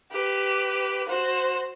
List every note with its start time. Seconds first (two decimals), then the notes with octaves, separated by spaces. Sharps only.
0.12 G4 B4
1.08 F#4 C5